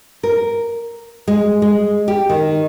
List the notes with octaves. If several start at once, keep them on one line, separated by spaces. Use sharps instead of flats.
A#4
G#3
G#3
G4
D#3